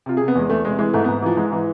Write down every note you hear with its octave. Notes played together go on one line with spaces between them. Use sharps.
C3 F4
G#4
C3
B3
E2 G#3
E2 A3
C3 G#3
E3 G#3
G#2 A3
B3
G#2
E3 F3
G#2 G#3
E3